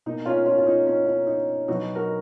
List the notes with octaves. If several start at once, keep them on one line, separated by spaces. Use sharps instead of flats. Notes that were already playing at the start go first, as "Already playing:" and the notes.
B2 A#3 D#4
C#4 F4
C#4 F4
F4
D#4
C#4
D#4
D#4
B2 F#3 B3 D#4 F#4
F#4 A#4